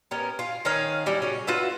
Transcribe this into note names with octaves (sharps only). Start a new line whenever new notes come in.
B3 C#4 G4 A#4
F4
D#3 C#4 G#4 F5
F#3 G3 C#4 E4
C#3 F#3 C#4
F4 F#4 B4 E5